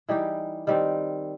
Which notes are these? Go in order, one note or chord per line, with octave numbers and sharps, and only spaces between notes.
E3 G3 D#4 G4
D#3 G3 C4